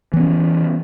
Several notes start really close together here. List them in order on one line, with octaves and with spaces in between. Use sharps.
E3 B3 C#4